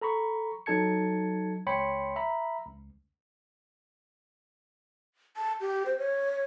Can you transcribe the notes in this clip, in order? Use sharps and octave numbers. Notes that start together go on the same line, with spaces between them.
A4 A#5 B5 C#6
F#3 D#4 A4 A5 G#6 C#7
C#2 C#5 G5 B5 C6 C#7
E5 A#5 B5
C#2
A5
G4
C5
C#5